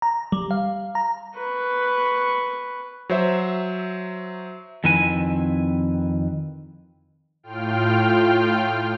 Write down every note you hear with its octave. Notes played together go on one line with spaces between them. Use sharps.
A#5
G3
F5
A#5
B4 C#6
F#3 C5 E5
F2 D#3 C4 E4 B4 G#5
A2 F4 G5 F6